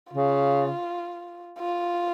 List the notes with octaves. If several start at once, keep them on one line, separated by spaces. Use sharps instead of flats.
C#3 F4
F4